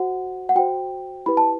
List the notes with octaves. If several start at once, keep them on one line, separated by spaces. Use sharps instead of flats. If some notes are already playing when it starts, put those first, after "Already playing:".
Already playing: F#4 C5 F#5
F#5
F#4 C5 G5
E4 G4 B4 B5
A5